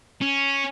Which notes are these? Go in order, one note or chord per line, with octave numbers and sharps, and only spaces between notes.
C#4